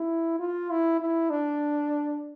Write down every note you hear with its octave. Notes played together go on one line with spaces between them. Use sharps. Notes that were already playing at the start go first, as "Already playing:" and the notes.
Already playing: E4
F4
E4
E4
D4